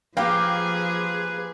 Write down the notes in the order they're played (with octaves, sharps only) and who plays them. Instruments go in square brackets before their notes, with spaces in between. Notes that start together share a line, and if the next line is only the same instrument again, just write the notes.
[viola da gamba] F3 G#4 [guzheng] A#3 G4 [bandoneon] B4 [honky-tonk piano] F5 G5